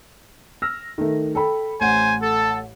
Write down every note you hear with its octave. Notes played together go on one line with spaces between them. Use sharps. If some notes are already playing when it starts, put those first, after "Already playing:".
E6 F6 A#6
D#3 A3
A4 G5 B5
A1 C5 F#5 G#5
A4